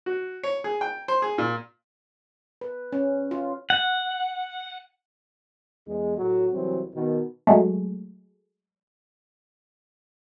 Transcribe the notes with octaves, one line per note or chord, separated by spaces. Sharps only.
F#4
C#5
G#4
G5
C5
G#4
A#2
B4
C#4
F4
F#5
E2 G#3
A2 F#3
C2 E3 F#3 C4
B2 D#3
F#3 G#3 A3